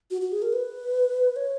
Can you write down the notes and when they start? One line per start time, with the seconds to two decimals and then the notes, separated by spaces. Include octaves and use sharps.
0.11 F#4
0.21 F#4
0.32 G#4
0.42 A#4
0.53 B4
1.36 C#5